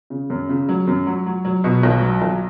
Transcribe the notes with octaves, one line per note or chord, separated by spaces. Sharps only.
C#3
F#2
C#3
F#3
F#2
F#3
F#3
F#3
B2
B1
F#3
B1